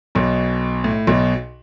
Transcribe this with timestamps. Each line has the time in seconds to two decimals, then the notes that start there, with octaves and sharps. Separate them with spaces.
0.15 B1 B2
0.84 A2
1.07 B1 B2